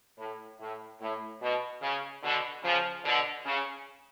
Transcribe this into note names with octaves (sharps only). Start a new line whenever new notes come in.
A2
A2
A2
B2
C#3
B2 D3
C#3 F3
B2 D3
C#3